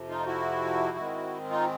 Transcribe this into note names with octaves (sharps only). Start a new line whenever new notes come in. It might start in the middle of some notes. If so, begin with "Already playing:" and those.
Already playing: F2 C3 F3
D#4 F4
E4 F#4
G#2 D#3 G#3 C4
D#4 F4